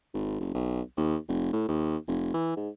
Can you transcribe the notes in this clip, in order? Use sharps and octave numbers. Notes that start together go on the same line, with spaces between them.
G#1
F#1
B1
D#2
F1
A2
D#2
F1
E3
G#2